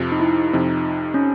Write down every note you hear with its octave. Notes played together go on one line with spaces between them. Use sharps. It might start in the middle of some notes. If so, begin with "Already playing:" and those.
Already playing: F2 C3 F3
D#4
E4
F2 C3 F3 D#4
C#4